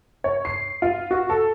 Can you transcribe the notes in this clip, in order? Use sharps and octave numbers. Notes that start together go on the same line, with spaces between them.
C#5
C7
F4
F#4
A4